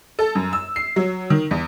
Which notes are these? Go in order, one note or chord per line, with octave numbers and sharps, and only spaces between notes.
A4
F#2
E6
C7
F#3
D#3
E2